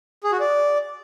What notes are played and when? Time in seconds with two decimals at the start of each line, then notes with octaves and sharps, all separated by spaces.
0.24 G#4
0.32 F#4
0.40 D5